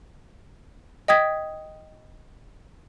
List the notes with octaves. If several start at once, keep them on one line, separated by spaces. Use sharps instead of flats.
D#5 G5 D#6 G#6 B6